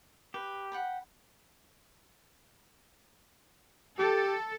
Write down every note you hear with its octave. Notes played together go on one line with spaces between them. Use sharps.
G4 B4
F#5 G5 B5
G4 A4